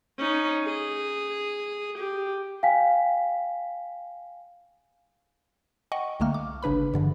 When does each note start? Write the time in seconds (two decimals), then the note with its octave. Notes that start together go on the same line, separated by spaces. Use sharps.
0.19 C#4 D#4
0.64 G#4
1.97 G4
2.63 F5 G5 G#5 B6
5.92 D#5 F#5 G5 C#6
6.20 C2 D3 A3 A#3 F6
6.34 D6
6.63 G1 C#3 D4 B4 B5
6.94 G2 D3 E3